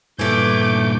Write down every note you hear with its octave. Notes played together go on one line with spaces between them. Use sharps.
G2 A#2 E3 A3 D6 G6